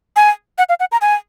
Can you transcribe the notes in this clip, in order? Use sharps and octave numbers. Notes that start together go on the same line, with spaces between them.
G#5
F#5
F5
F#5
A#5
G#5